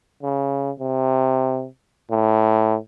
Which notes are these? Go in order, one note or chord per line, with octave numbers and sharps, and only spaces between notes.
C#3
C3
A2